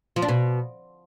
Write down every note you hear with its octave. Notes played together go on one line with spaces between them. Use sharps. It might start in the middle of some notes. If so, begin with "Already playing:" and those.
F3
D4
B2